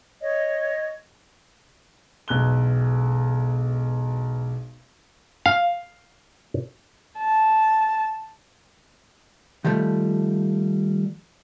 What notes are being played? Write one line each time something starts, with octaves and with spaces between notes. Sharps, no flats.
C#5 D#5
E1 B1 F#6 G7
F5
A5
D#3 F3 G3 A3